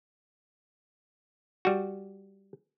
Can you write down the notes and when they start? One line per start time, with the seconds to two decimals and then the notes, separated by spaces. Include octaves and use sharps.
1.65 G3 F#4